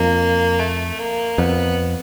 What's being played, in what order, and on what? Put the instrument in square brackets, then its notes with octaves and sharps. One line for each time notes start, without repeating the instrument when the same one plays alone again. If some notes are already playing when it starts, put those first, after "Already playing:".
Already playing: [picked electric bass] F2 [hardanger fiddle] A#3
[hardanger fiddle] A3
A#3
[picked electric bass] F2 [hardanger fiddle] B3